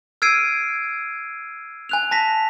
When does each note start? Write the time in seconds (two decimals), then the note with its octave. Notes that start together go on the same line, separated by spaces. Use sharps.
0.22 E6 F6 G#6 C7 D7 D#7
1.89 G#5 F#6 F7
2.11 A5 A#6 B6